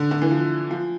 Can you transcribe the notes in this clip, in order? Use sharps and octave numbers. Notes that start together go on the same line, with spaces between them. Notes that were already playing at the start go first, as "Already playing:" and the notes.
Already playing: D3
D3
E3
F3
F3